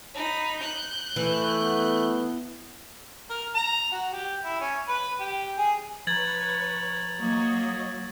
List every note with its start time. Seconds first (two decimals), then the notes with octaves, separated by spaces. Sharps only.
0.14 D#4 B5
0.60 F#6 G6
1.16 E3 A3
1.56 B3
3.30 A#4
3.55 A#5
3.91 F#4
4.13 G4
4.44 E4
4.60 C#4
4.88 B4
5.20 G4
5.58 G#4
6.07 F3 B4 C#5 A#5 G#6 A6 F#7
7.18 F#3 A#3 C#5 D#5